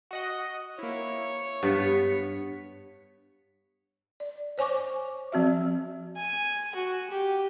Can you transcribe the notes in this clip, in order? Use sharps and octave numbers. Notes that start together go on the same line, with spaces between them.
F#4 D#5 F#5
A#3 E4 C#5
G2 B3 B6 C#7
D5
C5 C#5 G#5 C#6 D6
F3 C4 F#4 E5
G#5
F#4
G4